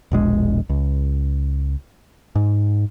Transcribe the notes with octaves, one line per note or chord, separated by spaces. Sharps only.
E1 A#1 G#3
C#2
G#2